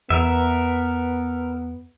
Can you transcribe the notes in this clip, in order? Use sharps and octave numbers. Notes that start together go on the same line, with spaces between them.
E2 B3 A#4 E5